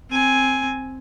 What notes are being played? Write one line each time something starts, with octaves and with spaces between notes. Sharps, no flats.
C4 G#5